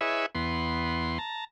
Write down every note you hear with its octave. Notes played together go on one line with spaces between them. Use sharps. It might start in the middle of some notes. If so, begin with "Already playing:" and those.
E4 G#4 B4 C#5 D#5 E5
E2 B3 C6
A5 A#5